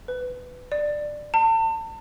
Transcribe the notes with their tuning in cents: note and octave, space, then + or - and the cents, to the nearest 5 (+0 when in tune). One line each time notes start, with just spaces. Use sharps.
B4 +15
D5 +15
A5 +35